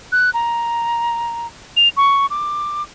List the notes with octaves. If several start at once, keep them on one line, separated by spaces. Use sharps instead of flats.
F#6
A#5
F7
C#6
D6